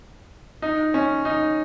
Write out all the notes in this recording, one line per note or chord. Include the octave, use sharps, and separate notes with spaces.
D#4
C#4
D#4